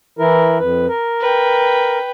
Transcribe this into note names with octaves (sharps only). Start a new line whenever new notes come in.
E3 E4 A#4
F2 B4
A#4
B4 G5